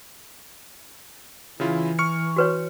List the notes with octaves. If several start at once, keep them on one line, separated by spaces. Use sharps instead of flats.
C#3 E3 E4 F4
C#6 F6 C#7
F#4 B4 C#5